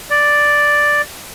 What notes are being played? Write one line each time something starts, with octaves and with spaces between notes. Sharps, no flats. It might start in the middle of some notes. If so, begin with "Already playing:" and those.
D5